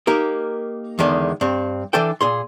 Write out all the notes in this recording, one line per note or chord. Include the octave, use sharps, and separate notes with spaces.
A#3 D#4 G4 A#4
E2 D3 D#3 G#3
G2 C4
E3 D4 A4 G5
A#2 G#4 C6